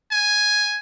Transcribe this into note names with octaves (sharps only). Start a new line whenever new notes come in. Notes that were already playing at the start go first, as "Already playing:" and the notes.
G#5